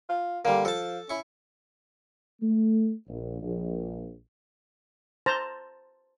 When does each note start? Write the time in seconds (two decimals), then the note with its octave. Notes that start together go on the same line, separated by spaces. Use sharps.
0.10 F4
0.45 D3 G3 A#3
0.65 F3 A4 A5
1.10 C#4 E4 C#6
2.41 A3
3.07 A#1
3.42 A#1
5.26 C5 A5 A#5